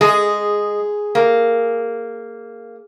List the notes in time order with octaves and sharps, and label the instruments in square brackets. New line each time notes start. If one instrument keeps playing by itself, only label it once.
[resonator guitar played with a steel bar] G#3 [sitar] G#4
[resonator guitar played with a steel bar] A#3